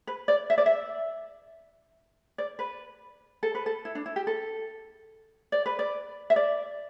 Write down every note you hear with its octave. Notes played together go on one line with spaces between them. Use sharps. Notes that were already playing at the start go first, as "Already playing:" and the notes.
B4
D5
E5
D5
E5
D5
B4
A4
B4
A4
E4
D4
E4
G4
A4
D5
B4
D5
E5
D5